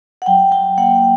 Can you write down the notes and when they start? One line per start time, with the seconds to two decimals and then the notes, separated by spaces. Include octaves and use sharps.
0.22 F#5
0.26 F#3 G5
0.52 F#3 G5
0.78 A#3 F#5